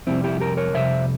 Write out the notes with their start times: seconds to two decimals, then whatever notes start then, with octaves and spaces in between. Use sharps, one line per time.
0.07 F2 C3 G3 C4 E4
0.24 E4 G4
0.40 G4 A#4
0.57 A#4 C#5
0.74 F2 C3 G3 C5 E5